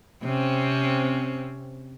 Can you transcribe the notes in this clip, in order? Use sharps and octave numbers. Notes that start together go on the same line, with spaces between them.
C3 C4 C#4